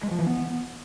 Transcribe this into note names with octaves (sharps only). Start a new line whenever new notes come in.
G#3
F3
E3
B3